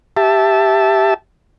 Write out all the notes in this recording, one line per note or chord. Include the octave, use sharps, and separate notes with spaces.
G4 E5 A5